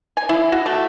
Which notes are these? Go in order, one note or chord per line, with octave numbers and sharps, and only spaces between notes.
G#5
E4
F#4
A3